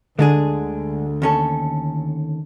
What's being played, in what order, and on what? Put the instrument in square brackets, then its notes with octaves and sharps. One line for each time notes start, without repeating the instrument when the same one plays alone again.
[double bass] D2 [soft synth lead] D3 [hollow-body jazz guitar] G#3 D4 G#4
[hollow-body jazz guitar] D#2 C#4 A4